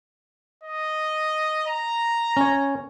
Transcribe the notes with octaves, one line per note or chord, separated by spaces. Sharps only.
D#5
A#5
C#4 C#5